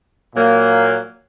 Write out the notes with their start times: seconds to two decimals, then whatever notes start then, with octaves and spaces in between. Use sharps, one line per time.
0.34 A#2 F#3 A#3